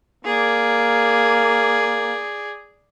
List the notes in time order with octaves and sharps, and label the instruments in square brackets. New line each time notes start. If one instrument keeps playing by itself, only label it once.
[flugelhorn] A#3 [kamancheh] G#4 D5